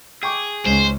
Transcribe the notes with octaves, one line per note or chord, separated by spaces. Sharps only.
G#4 G5 C#6 D6
C#2 G#2 G#3 C#4 C5